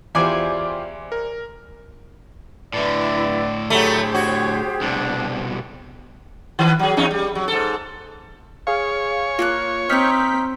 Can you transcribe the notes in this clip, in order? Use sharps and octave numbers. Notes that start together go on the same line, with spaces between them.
E2 F4 G4 C5 D5 G#5
A#4
A2 D3 E4 B4 D5
F#3 A3 G4 G#4 C5 B5
F#4 C#5
C2 B2 D4
D#3 A#4 B4
F#3 G#4
E2 C#4 D#4
G3
F#3
G#2 A4
G#4 C#5 F5
A#3 F4 G5 F#6
C4 D#4 A#5 F6 G6 B6